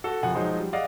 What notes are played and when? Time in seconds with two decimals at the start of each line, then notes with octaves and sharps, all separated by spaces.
0.04 F#4 A4
0.23 F#1 C3 F3 F#5 G#5
0.35 F3 F#3 G#3 D#4 C5
0.60 G3
0.73 G#4 D5 D#5 F5 F#5